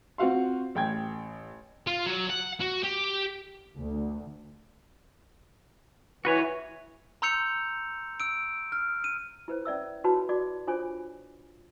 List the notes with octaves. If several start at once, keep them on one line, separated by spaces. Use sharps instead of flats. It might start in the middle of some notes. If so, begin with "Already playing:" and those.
C4 F4 F#4 F5 C6
A1 G5 G#6
F4
F#3
F#5
F#4
G4
D2
E3 F#4 B4 C#5
A#5 C6 E6 G6 C#7 F7
E6 D7
F6
D#7
E4 B4 C5
C#4 D5 E5 E6
E4 F#4 B4 C#5 A5 B5
F#4 D5 D6
D4 F4 C5 C#5 G#5 D6